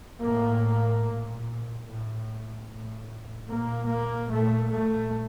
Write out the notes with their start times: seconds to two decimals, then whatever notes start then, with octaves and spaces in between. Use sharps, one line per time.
0.25 A2 A#3
1.06 A#2
1.87 A2
2.68 A2
3.49 A#2 A#3
3.90 A#3
4.31 A#2 A3
4.72 A3